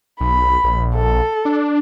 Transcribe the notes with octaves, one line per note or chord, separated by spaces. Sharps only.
B1 B5
A#1
A4
D4